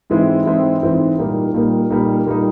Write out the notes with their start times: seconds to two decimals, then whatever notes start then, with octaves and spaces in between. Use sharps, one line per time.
0.10 G#2 E3 G#3 C4 E4
0.46 G#2 E3 G#3 C4 E4
0.82 G#2 E3 G#3 C4 E4
1.18 A#2 G3 A#3 D#4
1.54 A#2 G3 A#3 D#4
1.90 A#2 G3 A#3 D#4
2.26 A#2 G3 A#3 D#4